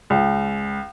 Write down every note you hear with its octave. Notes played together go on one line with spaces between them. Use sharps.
C#2